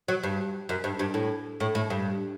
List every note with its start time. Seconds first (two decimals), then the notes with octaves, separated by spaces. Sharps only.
0.08 F#3
0.23 G2
0.69 F#2
0.84 G2
0.99 G2
1.14 A2
1.60 A2
1.75 A2
1.90 G2